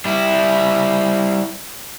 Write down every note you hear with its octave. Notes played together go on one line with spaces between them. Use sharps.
G3 E4